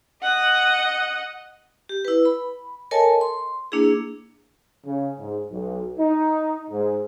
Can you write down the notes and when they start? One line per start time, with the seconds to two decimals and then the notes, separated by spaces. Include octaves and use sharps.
0.22 D#5 F#5
1.89 G4
2.05 E4 B4
2.25 B5
2.91 A4 A#4 C#5 D#5 G#5 A5
3.21 C6
3.72 A#3 D4 E4 G#4
4.85 C#3
5.19 G#2
5.50 B1
5.98 D#4
6.70 G#2